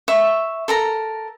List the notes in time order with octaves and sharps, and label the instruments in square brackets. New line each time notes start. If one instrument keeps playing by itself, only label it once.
[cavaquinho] E5 C#6
A4 A#4 A#5